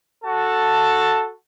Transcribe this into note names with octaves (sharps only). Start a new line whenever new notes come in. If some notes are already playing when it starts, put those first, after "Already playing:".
F#4 A4 A5